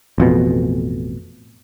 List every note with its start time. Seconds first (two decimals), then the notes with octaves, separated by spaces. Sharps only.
0.18 A1 F2 B2